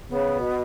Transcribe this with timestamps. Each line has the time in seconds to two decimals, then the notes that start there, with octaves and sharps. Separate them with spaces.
0.10 C#3 B3
0.36 B2